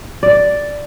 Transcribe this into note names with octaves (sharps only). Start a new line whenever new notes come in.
D5